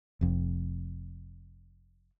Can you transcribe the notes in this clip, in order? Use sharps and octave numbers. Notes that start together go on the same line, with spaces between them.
F1 F2